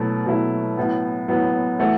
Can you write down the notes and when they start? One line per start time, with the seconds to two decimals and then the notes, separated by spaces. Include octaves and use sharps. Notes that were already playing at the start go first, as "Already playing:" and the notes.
Already playing: B2 F#3 A3 E4
0.26 B2 F#3 A3 E4
0.77 A2 F#3 B3
1.28 A2 F#3 B3
1.79 E3 A3 F#4